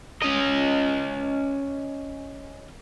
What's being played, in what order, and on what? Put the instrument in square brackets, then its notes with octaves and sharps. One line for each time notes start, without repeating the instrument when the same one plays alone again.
[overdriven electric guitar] C#4 D#5